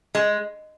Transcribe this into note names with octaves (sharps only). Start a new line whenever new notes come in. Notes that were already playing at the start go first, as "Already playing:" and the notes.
G#3